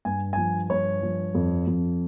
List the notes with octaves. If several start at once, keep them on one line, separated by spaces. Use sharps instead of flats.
G2 G#5
F3 G#5
G2 C#5
F3
F2
F2